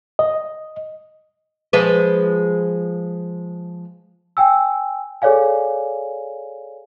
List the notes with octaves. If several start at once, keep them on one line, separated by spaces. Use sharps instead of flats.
D#5
F3 G#3 B4
G5 G#5 E6
G#4 A4 C#5 D5 F5 G#5